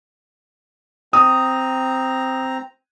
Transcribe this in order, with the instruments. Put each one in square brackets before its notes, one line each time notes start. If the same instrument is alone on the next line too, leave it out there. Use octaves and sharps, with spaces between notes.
[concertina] C4 A#5 [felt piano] D#6